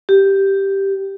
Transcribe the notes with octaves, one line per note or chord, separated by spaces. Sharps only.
G4